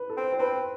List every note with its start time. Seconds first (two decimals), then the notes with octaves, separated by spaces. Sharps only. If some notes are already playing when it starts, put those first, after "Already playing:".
Already playing: B4
0.10 A4
0.17 C4
0.33 C5
0.39 C4 B4